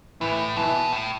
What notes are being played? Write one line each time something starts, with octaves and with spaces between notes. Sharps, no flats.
A2 E3
B2 E3
A2